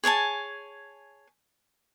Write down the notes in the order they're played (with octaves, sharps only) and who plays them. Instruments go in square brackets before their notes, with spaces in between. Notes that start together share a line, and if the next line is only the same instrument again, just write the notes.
[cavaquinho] G#4 C#5 G#5 A5